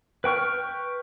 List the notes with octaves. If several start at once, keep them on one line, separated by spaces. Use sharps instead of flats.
B4 G5 C#6 F6